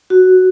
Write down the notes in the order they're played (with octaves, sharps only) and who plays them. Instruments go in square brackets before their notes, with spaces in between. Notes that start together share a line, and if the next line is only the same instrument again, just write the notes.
[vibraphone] F#4